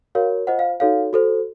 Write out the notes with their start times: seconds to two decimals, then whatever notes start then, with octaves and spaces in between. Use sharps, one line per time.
0.15 F#4 A#4 C#5 F5
0.47 F4 C5 D#5 F#5
0.59 F5
0.80 D#4 F#4 A4 C#5 F5
1.13 F#4 A4 C5